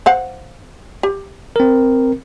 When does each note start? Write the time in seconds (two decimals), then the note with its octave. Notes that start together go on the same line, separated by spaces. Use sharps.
0.06 C5 F5 F#5
1.03 G4
1.56 C4 A#4